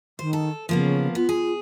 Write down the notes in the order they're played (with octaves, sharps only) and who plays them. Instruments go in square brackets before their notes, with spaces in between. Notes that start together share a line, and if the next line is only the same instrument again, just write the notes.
[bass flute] D#3 [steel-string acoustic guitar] C5
[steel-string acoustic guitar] A4
[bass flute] C#3 [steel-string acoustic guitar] F3 A#3 B3
[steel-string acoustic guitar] B3 [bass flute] F4
[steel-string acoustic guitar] G#4